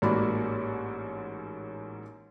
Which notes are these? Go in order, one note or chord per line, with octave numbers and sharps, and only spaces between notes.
A1 G#2 A#3 F#4 D5 B5